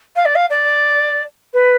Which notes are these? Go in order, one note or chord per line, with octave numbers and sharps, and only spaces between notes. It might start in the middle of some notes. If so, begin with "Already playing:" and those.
F5
D5
F5
D5
B4